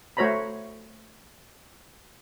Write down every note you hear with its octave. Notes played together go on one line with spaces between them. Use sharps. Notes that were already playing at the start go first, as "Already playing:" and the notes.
A3 F#4 C5 C#5 A#5 B5